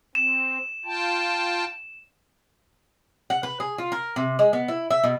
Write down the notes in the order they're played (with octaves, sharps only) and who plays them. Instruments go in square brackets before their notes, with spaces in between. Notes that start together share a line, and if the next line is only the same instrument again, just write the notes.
[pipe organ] C4 [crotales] E7
[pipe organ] F4 G5 A5
[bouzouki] F#5
B4
G#4
F4
A#4
C3
G#3
B3
E4
E5
B2